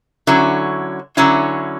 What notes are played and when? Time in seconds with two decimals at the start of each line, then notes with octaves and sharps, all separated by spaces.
0.27 D3 F#3 C#4 E4
1.17 D3 F#3 C#4 E4